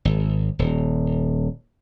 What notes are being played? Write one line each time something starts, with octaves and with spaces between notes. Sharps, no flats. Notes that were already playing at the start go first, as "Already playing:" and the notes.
G#1
D#1